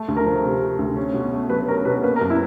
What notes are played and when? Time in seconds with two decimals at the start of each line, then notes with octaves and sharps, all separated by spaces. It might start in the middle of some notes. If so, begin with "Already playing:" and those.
Already playing: A3
0.08 D2
0.17 A#4
0.26 F3
0.44 C3
0.61 A3
0.79 D2
0.97 C#4
1.14 B2
1.33 A3
1.50 F#3 B4
1.67 C#4 A#4
1.85 B2 B4
2.03 A#3 B4
2.16 A#4
2.21 F#2
2.30 E4